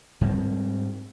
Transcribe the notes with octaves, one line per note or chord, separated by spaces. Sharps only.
G#2 G3 A#3 C4